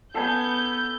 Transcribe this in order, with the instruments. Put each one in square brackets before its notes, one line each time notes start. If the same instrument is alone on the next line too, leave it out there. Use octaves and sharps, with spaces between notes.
[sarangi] B3 [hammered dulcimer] A4 G#5 [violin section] G6